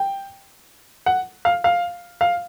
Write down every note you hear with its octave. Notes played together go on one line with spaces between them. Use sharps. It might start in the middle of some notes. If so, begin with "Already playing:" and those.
Already playing: G5
F#5
F5
F5
F5